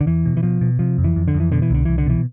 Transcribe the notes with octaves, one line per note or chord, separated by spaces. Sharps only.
D3
E2 E3
B2
E3
B2 F3
B2
C3 F3
F2
E3
F2
D3
F2
E3
B2 D3
E3
C2 D3
C2 E3
D3
B2 E3